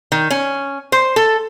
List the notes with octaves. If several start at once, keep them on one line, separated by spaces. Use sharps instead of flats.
D#3
C#4
C5
A4